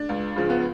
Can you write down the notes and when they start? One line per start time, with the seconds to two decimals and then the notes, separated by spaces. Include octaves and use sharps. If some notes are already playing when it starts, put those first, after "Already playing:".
Already playing: D4
0.09 C#2
0.36 C#3 F3
0.50 B3